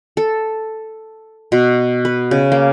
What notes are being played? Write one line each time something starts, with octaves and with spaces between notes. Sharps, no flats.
A4
B2
B4
C#3
A#3